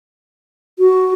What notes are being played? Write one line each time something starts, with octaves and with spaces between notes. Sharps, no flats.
F#4